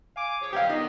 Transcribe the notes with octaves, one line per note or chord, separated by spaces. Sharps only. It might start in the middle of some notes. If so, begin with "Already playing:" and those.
F5 G#5 D6
F3 G#4 C#5
A#2 D3 F#3 G4 F5
D3 D#3 B3 D#4